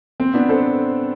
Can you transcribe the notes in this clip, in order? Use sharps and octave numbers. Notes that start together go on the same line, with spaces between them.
C4
B3 D4
A4 C5